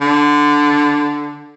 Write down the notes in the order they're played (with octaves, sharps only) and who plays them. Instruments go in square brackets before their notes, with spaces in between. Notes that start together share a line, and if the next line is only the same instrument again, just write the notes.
[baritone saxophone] D3